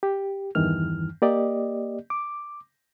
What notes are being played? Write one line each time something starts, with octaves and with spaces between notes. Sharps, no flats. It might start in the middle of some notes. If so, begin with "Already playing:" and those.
G4
E2 G2 D#3 E3 F6
A#3 G4 D5 D#5
D6